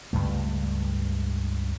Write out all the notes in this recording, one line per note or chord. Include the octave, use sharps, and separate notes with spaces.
C#2 G2 A3